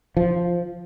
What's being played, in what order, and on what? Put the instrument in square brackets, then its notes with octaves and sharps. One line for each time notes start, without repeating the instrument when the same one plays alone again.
[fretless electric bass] F3